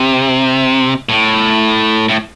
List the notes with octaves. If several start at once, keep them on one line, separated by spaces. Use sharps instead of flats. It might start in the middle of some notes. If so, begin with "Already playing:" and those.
Already playing: C3
A2
A2